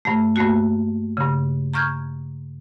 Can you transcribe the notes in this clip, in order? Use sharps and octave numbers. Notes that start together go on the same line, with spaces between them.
G2 A3
G2 A3 A#3 F#4
G2 C#3
A#5 C#6 F6 G6 G#6